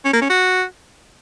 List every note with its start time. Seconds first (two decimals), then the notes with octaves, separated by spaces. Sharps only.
0.05 C#4
0.13 A#3
0.21 C#4
0.30 F#4